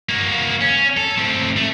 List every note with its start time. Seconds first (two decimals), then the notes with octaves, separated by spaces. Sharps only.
0.09 A#3 F#4
0.61 C#4
0.97 A4
1.18 A2 C4
1.56 A3